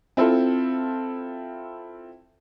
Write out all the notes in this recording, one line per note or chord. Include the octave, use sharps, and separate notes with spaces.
C4 E4 F4 A4 C5 A5